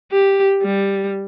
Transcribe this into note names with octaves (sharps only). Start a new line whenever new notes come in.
G4
G3